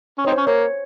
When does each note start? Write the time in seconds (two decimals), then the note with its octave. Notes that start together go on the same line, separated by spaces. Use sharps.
0.18 C#4
0.25 C4 D#4 C#5
0.32 C5
0.38 C#4
0.47 A#3 C#5